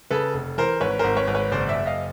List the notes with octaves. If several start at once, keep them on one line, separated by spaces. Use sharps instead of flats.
C#3 A4 B4
F1
E3 A#4 C5
G#1 B4 C#5
G#1 A#4 C5
B4 C#5
G#1
B4 C#5
F#1 C5 D5
D5 E5
F#1
D#5 F5